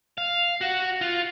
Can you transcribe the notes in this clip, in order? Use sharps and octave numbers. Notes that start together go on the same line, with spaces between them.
F5
F#4
F4